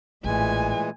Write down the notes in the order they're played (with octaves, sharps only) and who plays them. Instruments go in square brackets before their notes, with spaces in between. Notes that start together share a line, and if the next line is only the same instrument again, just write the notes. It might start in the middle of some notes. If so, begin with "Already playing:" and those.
[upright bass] A1 [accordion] A#2 E3 G#3 [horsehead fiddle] A3 G#5